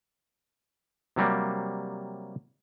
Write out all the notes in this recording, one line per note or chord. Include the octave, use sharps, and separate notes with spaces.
C3 F#3 G3 A#3